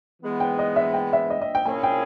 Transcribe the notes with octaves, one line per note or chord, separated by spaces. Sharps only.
E3 G#3 B3
G5
D#5
E5
G5
E5
D#5
D#5
G5
A#2 A#3 C#4 E4 G#4 G#5
G5